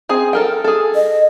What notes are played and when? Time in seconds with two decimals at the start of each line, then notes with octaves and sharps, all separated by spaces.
0.09 C4 G#4
0.33 A4 A#4 G5
0.64 G#4 A4
0.95 D#5